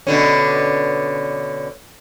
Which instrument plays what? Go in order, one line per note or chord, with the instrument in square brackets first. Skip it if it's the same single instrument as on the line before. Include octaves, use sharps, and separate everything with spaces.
[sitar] B2 D3 C#4